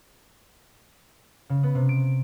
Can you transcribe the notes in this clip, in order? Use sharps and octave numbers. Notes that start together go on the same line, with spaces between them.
C#3
B3
C3
D7